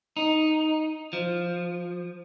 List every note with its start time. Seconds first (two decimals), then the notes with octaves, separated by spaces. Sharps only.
0.17 D#4
1.13 F3